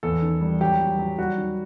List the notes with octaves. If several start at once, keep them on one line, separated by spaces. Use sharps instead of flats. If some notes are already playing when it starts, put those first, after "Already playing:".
E2 A4
D#3
G3
F#3 G4
F#3
F#3
G3 F#4
D#3